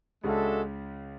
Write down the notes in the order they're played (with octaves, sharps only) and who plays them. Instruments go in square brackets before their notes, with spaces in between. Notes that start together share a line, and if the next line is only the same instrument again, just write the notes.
[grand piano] C#2 C#3 [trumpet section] G#3 D4 F#4 A4 E5